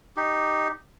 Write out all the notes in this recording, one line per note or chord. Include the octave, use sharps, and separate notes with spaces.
D#4 G4